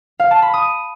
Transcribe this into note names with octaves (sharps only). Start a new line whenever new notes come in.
F5
A5
B5
D#6